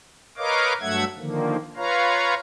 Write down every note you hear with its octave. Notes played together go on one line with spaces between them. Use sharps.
A#4 B4 C#5 D#5 F5 D6
G2 F#3 A3 E5 F#5 G#6
D3 D#3 F3 A#3
F4 B4 C#5 F5 A#5